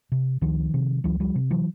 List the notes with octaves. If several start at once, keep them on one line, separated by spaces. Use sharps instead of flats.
C3
C#2 D#3 F3
C3
C#2 E3 F#3
F3 G3
C3
E3 F#3